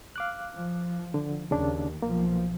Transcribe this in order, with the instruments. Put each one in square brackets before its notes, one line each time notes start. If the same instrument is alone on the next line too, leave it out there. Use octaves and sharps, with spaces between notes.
[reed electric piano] F5 D6 F#6
[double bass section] F3
[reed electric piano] D3
[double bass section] D#2 [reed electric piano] C#3 D4
[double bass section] B1 F3 [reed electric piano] A#3